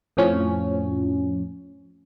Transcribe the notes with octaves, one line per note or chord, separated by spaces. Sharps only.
F2 A2 F3 C#4